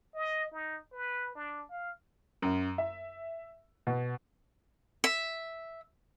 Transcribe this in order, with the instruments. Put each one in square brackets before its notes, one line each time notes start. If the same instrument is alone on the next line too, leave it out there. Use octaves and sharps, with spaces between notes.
[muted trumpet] D#5
D#4
B4
D4
F5
[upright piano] F#2
E5
B2
[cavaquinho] E5